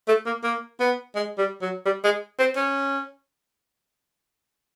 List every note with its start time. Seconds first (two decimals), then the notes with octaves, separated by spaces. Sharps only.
0.08 A3
0.26 A#3
0.44 A#3
0.80 B3
1.15 G#3
1.38 G3
1.62 F#3
1.86 G3
2.04 G#3
2.39 C4
2.56 C#4